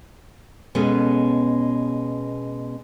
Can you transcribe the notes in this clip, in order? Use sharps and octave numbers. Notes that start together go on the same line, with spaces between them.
B2 G#3 B3 C#4 G#4 A4